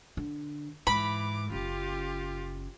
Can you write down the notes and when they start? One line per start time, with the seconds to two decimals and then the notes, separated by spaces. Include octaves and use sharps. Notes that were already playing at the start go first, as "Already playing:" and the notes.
0.17 D3
0.87 G#2 E3 B5 D6
1.50 F#1 C#3 F4 G4